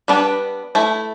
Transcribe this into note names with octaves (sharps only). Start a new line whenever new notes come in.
G3 B3 D4 B4
A3 E4